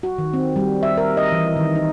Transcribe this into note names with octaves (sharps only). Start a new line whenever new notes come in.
F#4
D#3
C4
G3
E5
A#4
D#5
E3
D#3
D#4